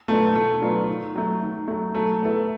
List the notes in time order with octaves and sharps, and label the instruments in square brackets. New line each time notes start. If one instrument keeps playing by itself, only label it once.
[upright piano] F#3 B3 D4 F4 [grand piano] A3
[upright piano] D#3 [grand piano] A3
[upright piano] F#3 B3 D4 F4
D#3
F#3 A3
D#3
F#3 A3
[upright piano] F#3 [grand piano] A3
[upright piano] B3 E4 A4